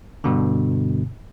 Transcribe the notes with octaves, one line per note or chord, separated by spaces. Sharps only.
G2 B2 D3